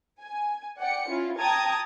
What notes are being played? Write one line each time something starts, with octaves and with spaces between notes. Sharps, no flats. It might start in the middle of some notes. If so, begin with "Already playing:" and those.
G#5
D5 F#5 G5 C#7
C#4 E4 F4
G5 A5 A#5 D#6 G#6 A6